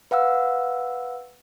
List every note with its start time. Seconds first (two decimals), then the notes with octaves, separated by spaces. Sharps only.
0.11 B4 F5 F#5 E6